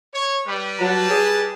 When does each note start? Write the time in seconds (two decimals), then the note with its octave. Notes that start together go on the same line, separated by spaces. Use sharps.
0.14 C#5
0.47 G3 B4
0.80 F#3 A5
1.10 G#4